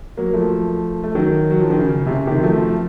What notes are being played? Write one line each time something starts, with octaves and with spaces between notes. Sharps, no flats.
F#3 A#3
F3 A3
A3
D#3 F#3
F#3
F3
D#3
C#3
C3
C#3
C3 D#3
F#3
F3 A3